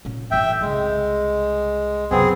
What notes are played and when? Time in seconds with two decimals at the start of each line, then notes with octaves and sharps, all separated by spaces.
0.05 A#2 C#4
0.31 A1 G2 E5 G5
0.61 C2 C#3 G#3
2.11 F#2 C3 B3 C4 G#4